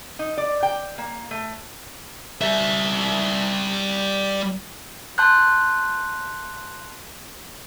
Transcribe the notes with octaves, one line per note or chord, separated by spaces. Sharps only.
D#4
D5
G5
A#3
A3
G3 E5
A5 C6 F#6 G6